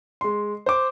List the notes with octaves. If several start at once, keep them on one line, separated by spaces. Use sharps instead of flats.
G#3 C6
C5 D6